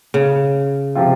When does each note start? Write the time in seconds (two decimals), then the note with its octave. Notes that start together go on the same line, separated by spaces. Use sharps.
0.14 C#3
0.95 C3 F3 C4 F4